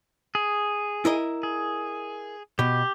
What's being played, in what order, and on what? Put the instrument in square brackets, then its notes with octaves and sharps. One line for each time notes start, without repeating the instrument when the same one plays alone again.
[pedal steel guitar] G#4
[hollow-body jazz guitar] E4 A#4 D#5
[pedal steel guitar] G#4
[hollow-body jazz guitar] B2 [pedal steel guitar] G4